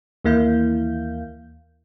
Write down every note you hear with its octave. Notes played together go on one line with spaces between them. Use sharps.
D#2 E3 A#3 E4 F5 G6